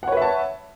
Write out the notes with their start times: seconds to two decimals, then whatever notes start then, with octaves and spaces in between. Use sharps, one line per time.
0.03 F#5
0.08 C#5
0.12 B4
0.17 E5
0.22 A5